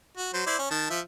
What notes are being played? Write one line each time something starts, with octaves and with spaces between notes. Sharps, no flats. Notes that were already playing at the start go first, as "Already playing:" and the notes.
F#4
F#3 C5
E4 C5 D5
C#4
D#3 A5
F3 E5